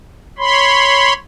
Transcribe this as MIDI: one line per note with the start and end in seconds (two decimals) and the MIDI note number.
0.38 1.13 73
0.38 1.13 83
0.38 1.13 84